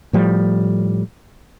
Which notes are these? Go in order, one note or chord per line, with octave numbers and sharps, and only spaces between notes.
A2 F3 G3